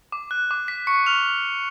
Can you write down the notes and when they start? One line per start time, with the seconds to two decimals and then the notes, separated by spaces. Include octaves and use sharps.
0.12 D6
0.31 F#6
0.51 D6
0.68 B6
0.87 C#6 C#7
1.06 F6 F7